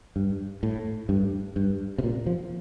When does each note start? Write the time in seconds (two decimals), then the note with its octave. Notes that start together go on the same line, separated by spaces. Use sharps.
0.16 G2
0.63 A2
1.09 G2
1.56 G2
1.98 C3
2.04 A#2
2.26 F3